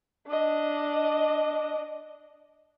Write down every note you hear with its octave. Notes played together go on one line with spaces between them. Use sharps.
D4 D#5